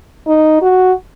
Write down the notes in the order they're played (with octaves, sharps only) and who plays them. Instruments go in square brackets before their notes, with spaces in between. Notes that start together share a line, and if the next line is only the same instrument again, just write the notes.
[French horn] D#4
F#4